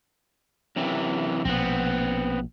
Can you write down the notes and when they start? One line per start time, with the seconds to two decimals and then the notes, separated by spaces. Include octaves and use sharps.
0.76 F#2 C3 E3
1.45 A#1 B2 B3 C4